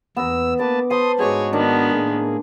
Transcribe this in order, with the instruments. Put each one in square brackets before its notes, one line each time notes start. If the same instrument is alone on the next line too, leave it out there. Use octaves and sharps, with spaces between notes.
[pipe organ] E2 E6 [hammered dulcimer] B3 A#5
[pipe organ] A#3 B4 A5 [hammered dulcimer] D6
[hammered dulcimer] B4 C5 A5 [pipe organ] C6 D#6
[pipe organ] G#2 F#4 [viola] G#4 C#5 [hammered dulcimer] C5 D#5 D6
[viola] D#3 B3 [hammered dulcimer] D4
[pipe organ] A2 A#3 G#4